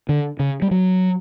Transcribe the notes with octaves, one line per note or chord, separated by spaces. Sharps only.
D3
C#3
G3
F#3